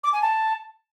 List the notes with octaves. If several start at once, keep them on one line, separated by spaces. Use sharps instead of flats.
D6
G#5
A5